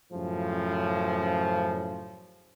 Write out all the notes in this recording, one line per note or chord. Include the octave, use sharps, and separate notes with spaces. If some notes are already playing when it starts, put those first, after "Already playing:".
F#2 A2 C#3 F3